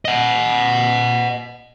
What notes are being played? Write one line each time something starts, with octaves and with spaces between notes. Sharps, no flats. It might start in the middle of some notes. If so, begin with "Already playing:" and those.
D#5 F#5